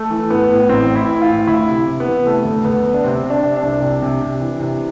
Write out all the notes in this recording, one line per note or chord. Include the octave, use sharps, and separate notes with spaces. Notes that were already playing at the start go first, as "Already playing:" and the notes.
Already playing: A3
E3
A2 B3
A2
A1 C4
A2
E4
E3
F4
A2
D2 E4
C3
C3
B3
E3
C3 A3
D2
D2 B3
D2
D4
C3 C4
C3
D4
C3
D4
C2
C3
C3
C3
E3
C3